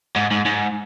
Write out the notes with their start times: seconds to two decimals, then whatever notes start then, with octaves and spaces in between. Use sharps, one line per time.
0.16 G#2
0.31 G#2
0.46 G#2